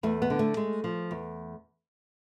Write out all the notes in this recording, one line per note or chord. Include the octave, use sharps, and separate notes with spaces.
E2 A3
B3
D3
A3
G#3
F3
E2